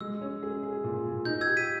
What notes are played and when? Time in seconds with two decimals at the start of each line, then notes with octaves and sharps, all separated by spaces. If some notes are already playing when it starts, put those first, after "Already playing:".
0.01 G#3 E6
0.21 C#4
0.43 G#4
0.63 G#4
0.84 A#2
1.05 A#2
1.25 D#4 G6
1.41 E6 G#6
1.46 G4
1.57 B6 D#7